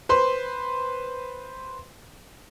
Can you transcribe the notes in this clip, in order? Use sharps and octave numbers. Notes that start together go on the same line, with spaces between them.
B4 C5 C6